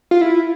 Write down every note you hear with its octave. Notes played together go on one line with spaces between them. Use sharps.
F4
E4